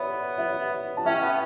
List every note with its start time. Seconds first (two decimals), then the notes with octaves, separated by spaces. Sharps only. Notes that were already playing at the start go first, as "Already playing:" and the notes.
Already playing: B3 C#5 D5 E5 F#5
0.38 C#5 E5
0.97 A5
1.06 C#4 E5 G5
1.22 B3